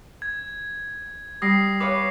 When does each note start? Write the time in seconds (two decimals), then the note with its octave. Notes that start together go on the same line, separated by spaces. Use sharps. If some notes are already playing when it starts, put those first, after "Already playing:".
0.22 G#6
1.42 G3 D#6 A#6 C7
1.81 B4 C#5 F5 D6